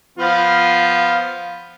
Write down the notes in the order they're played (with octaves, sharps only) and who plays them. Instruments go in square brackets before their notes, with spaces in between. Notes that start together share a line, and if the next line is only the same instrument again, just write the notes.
[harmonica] F3 B3 F4 [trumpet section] F5